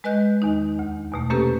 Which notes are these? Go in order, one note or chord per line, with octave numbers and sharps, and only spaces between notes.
G#3 B4 D#5 F#6 G6
E2 D#3 D#4
D2
E2 B2 A3
C3 A#3 C#4 G4 A4 B4